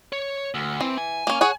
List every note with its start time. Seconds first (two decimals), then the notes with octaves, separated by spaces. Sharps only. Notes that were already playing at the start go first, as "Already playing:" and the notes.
0.13 C#5
0.54 D2
0.81 E3 C4
0.98 G#5
1.27 A#3 C#4
1.41 G#4 C#5 F#5